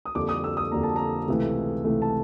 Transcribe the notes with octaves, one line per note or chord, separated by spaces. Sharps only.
D#6
F2 D3 G3 A#3 D6
D#6
E6
D#6
F2 D3 G3 A#3 A#5
A5
A#5
C#2 C3 E3 A3
C#2 C3 E3 A3
A5